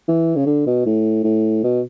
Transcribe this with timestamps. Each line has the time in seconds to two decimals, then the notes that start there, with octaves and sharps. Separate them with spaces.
0.08 E3
0.36 C#3
0.46 D3
0.66 B2
0.86 A2
1.24 A2
1.64 B2